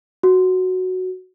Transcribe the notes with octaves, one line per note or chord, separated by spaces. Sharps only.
F#4